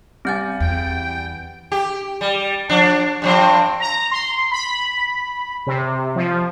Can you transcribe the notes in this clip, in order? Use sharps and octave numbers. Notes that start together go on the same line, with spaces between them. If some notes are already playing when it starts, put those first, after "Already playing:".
G3 C4 F#5 G#5 G6 A6
E2 G5
G4
G3
F3 D4
G2 F3 C4
A#5
C6
B5
C3
F3